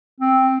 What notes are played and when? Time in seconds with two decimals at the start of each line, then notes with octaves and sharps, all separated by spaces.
0.20 C4